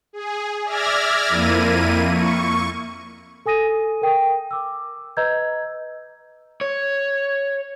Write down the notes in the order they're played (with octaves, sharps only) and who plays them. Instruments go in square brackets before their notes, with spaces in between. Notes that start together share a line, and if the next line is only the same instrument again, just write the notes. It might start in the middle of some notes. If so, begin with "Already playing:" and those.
[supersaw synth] G#4
D5 E5 F6 G#6 A#6
F2 A#3 E4 D#7
C#6
[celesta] A4 G#5 D#6 A#6 D#7
A#4 G5 D#6
D6 E6
B4 D#5 A#5 E6 G6 G#6
[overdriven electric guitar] C#5